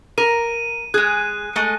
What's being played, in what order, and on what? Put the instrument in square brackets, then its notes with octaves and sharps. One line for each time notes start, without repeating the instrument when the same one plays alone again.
[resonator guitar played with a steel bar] A#4 [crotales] D#7
[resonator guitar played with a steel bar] G#3 G#4 [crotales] F#6
[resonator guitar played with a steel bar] G#3 A3